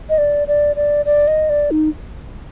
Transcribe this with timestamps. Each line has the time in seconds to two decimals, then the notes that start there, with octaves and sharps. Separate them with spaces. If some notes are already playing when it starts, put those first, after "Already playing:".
0.10 D#5
0.18 D5
0.48 D5
0.76 D5
1.05 D5
1.28 D#5
1.50 D5
1.71 D#4